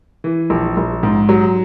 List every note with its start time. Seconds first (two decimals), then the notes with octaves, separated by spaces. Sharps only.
0.24 E3
0.50 A#1
0.77 A#1
1.03 G#2
1.29 F#3